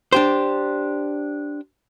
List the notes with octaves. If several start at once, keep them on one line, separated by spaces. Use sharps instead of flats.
D4 G4 C5